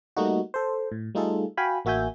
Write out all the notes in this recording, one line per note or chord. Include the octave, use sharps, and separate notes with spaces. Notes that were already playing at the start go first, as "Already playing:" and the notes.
G3 A3 A#3 D#4 F#4
A4 C5
A2
G3 A3 D#4 F4 G#4 A4
F#4 F5 G5 G#5 B5
A1 A#3 F#4 E5 G#5 G6